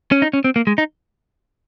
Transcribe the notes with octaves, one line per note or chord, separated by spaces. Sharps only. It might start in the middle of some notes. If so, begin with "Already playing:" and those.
C#4
D#4
C#4
C4
A#3
G#3
D#4